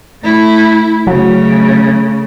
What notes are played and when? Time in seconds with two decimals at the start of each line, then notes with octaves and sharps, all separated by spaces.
0.21 A3 E4
1.07 C#3 F#3 A3